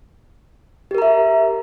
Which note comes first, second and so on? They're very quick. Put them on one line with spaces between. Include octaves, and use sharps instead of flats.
G4 A#4 A#5 E5